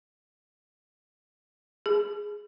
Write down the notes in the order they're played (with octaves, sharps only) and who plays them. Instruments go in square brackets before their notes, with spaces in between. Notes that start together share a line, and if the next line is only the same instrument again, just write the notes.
[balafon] G#4